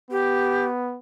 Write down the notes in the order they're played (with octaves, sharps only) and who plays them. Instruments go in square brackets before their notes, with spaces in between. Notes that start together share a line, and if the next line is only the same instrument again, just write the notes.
[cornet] B3 [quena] G4